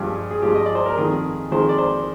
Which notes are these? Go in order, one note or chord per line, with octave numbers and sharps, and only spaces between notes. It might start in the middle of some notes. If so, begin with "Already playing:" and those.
Already playing: G2 F3 G#3 G4 G#4
G#4
G2 F3 G#3 G4
D#5
D5
C5
A#4
F2 D#3 G#3 G#4
F2 D#3 G#3 C5
D5
C5